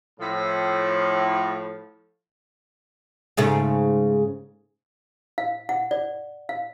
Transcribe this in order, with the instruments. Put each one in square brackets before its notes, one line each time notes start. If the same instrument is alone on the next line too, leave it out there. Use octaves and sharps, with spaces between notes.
[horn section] A2 F3
[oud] G#2 C#3 A3
[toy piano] F5
F#5
D5
F5